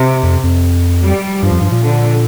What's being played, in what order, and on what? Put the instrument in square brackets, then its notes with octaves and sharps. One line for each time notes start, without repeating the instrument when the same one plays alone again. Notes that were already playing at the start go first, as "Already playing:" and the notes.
Already playing: [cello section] C3
[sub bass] F2
F2
[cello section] G3
[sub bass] G2 [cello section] F3
[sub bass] F2
G2
A#2
[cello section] D3